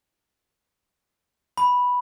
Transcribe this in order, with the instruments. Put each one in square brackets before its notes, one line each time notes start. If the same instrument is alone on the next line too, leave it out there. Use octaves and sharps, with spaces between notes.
[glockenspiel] B5